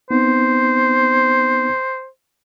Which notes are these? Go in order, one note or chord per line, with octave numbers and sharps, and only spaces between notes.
B3 C4 D#4 C5